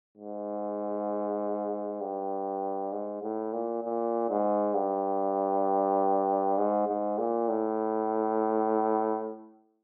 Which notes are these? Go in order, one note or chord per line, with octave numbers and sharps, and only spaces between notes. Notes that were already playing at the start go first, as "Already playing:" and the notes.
G#2
G2
G#2
A2
A#2
A#2
G#2
G2
G#2
G#2
A#2
A2